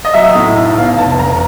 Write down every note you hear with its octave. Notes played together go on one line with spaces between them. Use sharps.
D#5
F#3 E5
A2
B1
B2 F5
F1 A5
F1 A#5